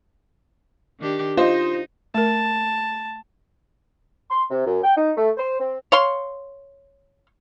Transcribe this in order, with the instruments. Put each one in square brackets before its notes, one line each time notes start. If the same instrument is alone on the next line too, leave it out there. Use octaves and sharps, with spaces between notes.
[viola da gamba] D#3 D4 G4
[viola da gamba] D#4 [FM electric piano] F4 [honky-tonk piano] C5 D#5
[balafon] A3 A#4 [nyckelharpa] A5
[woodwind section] C6
C3
F#2
G5
D#4
A3
C5
C4
[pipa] C#5 F5 C6